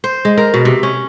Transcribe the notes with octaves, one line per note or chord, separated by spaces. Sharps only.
C5
G#3
A#4
B2
C3
C#4